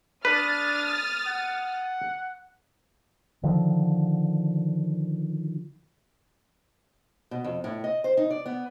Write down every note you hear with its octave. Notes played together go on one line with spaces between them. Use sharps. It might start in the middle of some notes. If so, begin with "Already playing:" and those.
D4 B4 D#6 F6 A6
F#5
D3 D#3 F3
B2
F2
A2
D#5
C5
D#4
D5
B3